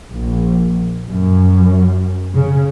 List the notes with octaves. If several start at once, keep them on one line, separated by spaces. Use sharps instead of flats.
A#1
F#2
C#3